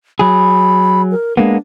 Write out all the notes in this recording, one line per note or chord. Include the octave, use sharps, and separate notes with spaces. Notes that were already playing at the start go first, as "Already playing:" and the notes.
F#3 G#4 B5
A#4
G#3 A#3 B3 D4